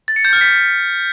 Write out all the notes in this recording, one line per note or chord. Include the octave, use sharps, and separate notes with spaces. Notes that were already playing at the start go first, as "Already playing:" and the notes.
A6
C#7
G6
F6
B6